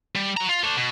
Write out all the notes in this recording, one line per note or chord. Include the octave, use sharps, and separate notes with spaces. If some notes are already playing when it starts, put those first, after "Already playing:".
G3
F#3 A#5
F4
A3 D4
B2